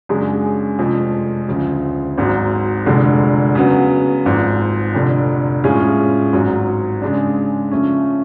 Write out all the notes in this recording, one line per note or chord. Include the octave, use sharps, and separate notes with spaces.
F#2 C#3 G#3 D4 G#4
F1 F2 F3 G#3
D2 C#3 F3
G#1 G#2 F#3
F1 F2 D3 G#3
C#3 F#3 B3
G#1 G#2 F3
F1 F2 D3
A2 G#3 C#4 F4 G#4
G#1 G#2 F#3
C#3 G#3 D4
C#3 F3 A3 C#4